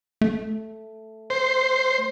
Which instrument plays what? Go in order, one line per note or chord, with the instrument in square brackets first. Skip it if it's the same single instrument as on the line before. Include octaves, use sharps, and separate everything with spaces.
[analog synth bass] A3
[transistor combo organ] C5